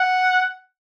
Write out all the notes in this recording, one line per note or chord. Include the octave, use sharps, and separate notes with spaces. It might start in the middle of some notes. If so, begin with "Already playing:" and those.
Already playing: F#5